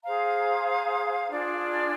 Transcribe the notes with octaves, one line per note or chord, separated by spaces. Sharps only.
G#4 C5 F5 A#5
D4 F4 G#4 D5